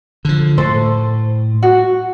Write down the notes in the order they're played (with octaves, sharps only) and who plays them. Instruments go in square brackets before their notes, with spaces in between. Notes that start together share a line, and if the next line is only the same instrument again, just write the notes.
[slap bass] D3 F3
[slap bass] A2 [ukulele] A4 C5
[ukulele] F#4